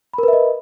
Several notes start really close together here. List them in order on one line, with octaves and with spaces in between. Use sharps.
B5 A#4 B4 E5 D#5